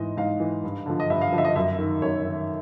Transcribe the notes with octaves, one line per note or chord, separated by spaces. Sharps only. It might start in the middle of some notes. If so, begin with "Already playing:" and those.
Already playing: G#2 E3 D#5
G#2 F5
E3
G2
D3 F3
D#5
G2 E5
F5
D3 F3
E5
D#5
F#2 E5
D#3
F#2 C#5
D#3